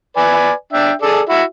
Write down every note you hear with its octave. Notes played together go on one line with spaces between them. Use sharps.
B4 D5 G#5
D4 E5 G5
G#4 A4 D5
E4 F#4 E5